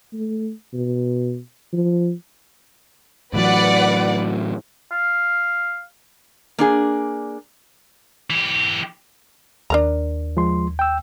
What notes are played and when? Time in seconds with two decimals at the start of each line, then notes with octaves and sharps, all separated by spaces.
0.13 A3
0.74 B2
1.73 F3
3.33 A2 E3 F#3 B4 D5 F#5
4.92 F5
6.59 A#3 D4 G#4
8.30 E3 G4
9.70 D#2 D4 A#4 A#5
10.37 F3 G#3 C6
10.79 G5 E6